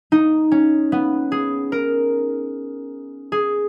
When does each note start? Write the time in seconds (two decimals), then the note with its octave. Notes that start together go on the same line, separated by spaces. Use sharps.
0.12 D#4
0.52 C#4
0.92 B3
1.32 G#4
1.72 A#4
3.32 G#4